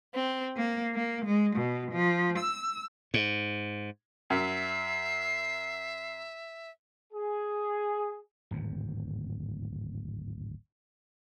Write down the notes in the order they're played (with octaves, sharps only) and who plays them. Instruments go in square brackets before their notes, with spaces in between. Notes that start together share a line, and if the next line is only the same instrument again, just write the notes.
[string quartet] C4
A#3
A#3
G#3
B2
F3
E6
[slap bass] G#2
[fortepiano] F#2 [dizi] E5 [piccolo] C7
[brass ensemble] G#4
[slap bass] D1 G#1 E2